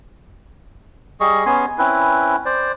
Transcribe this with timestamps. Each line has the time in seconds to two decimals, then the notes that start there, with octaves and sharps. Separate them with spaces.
1.20 G3 G#4 D#5 C#6
1.46 B3 C#4 G#5 C6
1.78 C4 C#4 E4 B4
2.46 C5 D5